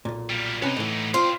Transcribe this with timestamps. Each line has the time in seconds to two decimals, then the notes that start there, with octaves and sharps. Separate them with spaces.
0.05 B1 A#2
0.30 G3 A#3
0.62 C3 B3 C#4 D#4 B4
0.76 A2 E3
1.14 A2 C4 F4 F5